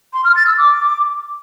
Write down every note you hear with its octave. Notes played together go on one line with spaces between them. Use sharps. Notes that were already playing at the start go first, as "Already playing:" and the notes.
C6
F6
A6
E6
D6